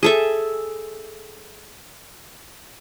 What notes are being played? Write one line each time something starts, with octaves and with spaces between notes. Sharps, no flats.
G#4 A4 E5